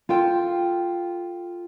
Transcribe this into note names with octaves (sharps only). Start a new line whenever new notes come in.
F4 A4 G5